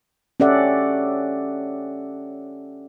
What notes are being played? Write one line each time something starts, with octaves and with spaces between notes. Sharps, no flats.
C#4 G4 A4 D5 E5 F#5